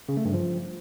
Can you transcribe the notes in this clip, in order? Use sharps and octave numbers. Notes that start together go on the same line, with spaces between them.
C#3
A3
G2
F3